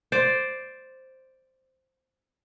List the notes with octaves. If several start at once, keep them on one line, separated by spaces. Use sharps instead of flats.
C5 D5